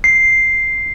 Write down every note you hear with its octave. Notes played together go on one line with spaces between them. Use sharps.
C7